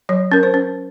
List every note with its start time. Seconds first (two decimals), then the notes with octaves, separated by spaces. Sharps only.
0.09 F#3 C#5
0.32 C#4 A#4
0.43 C5
0.54 C#4